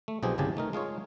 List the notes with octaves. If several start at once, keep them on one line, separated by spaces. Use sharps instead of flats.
A3
B1 B2 F3 C4 G4 G#4
G1 C2 C#3 G4 G#5 A5
A3 D#4 A#4
G#3 F4 G#4 C#5